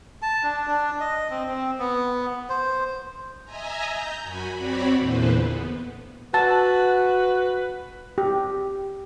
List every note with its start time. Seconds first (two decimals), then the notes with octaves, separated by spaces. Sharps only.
0.22 A5
0.43 D4
0.67 D4
1.00 D#5
1.30 C4
1.48 C4
1.79 B3
2.50 C5
3.44 D#5 E5 G#5 A#5
3.90 A#5 G6
4.23 F#2 F#4 G#5 B5
4.53 C4 F#4 C#5 D5 B5
4.97 E2 A#2 D3 E3 B4 C5
5.38 B3
6.34 F#4 B4 A5
8.18 G4